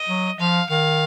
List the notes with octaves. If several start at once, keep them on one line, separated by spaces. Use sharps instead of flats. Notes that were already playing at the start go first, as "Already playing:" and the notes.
Already playing: D#5
F#3
F3 F5
D#3 F5